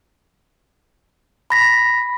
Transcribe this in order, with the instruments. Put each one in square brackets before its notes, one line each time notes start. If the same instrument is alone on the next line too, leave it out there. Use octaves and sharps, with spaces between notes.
[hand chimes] B5 A#6 B6